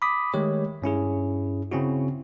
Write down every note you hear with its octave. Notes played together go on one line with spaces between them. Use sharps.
B5 D6 D#6 B6
D#3 G#3 A3 G4 C#5
G2 C#4 E4 G#4
C#3 C4 C#4 E4 F#4